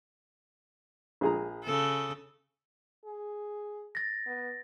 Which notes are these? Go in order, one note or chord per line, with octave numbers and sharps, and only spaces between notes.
A#1 G#4 A#5
C#3 A4
G#4
A6 A#6
B3